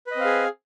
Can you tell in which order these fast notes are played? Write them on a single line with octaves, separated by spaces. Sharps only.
B4 D#5 C4 F5 G#4